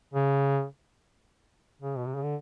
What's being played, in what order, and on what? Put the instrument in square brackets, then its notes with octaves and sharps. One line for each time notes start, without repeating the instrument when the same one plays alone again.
[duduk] C#3
C#3
B2
C3
C#3
D3